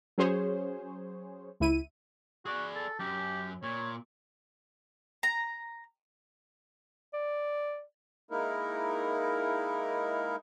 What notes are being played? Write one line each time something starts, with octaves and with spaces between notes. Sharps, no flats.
F#3 C#4 G#4 C5 C#5
C#2 E4 D#7
F#4 G#4 D5
A4
F#2 G4
A#2 C#5
A#5
D5
G#3 A#3 D#4 E4 A#4